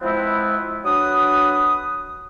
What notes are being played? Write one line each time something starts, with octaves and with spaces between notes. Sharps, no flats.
F3 G#3 B3 C4 E4
F#3 D4 B4 D#6